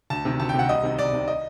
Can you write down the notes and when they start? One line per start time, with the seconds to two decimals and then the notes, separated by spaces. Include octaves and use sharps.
0.10 D2 A5
0.25 C3 D#3
0.40 D2 A5
0.49 G5
0.54 C3 D#3 F#5
0.69 C2 D#5
0.83 C3 D#3
0.99 C2 D5
1.13 C3 D#3
1.28 D#5